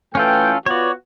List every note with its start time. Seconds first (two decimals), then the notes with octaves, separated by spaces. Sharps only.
0.15 E3 A3 C#4 F4 A4 G5
0.66 B3 F4 F#4 C#5 D5